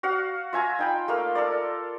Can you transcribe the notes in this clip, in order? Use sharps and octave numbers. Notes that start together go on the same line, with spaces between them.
F#4 F5 F#5
F4 E5 G#5 A#5
D#4 G5 B5
A3 A#3 F5
A4 A#4 D5